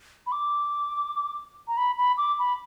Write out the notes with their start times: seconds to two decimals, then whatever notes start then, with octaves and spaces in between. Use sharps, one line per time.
0.26 B5
0.32 D6
1.68 A#5
1.77 B5
1.98 B5
2.17 D6
2.39 B5